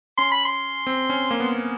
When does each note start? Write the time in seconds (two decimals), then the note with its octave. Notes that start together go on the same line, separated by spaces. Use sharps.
0.18 C#4 C6
0.32 B5
0.45 C6
0.87 C4
1.10 C#4
1.31 A#3
1.40 B3